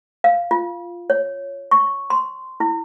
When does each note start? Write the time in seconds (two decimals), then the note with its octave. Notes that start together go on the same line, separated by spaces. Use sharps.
0.24 F5
0.51 F4
1.10 C#5
1.71 C#6
2.10 C6
2.60 E4